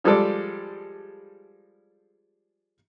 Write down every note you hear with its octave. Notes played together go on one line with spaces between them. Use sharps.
F3 G3 G#3 G#4 A4 D5